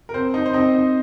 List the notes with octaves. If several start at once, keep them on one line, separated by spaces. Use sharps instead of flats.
A#4
C4 C5
D#4
C5
C4 D#4 D#5
D#4